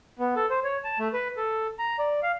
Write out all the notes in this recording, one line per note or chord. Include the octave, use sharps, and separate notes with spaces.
B3
A4
C5
C#5
A5
A3
B4
A4
A#5
D5
F5